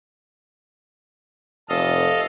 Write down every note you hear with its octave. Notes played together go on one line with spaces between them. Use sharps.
F1 A4 D#5 F5